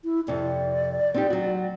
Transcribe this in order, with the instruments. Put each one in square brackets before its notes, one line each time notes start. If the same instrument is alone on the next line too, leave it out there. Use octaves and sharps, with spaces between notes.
[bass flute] E4
[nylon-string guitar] F2 C3 [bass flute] D5
[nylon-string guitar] C4 D#4 G4
F#3 F#4